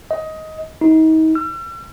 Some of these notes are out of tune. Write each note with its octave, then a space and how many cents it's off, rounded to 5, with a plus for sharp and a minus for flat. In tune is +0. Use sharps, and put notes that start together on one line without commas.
D#5 +15
D#4 +35
E6 +45